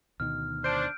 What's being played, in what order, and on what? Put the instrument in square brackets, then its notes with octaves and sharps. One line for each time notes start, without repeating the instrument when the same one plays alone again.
[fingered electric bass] D2 B2 D#3 [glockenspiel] F6
[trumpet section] D4 [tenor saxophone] C5 [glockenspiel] G6 D7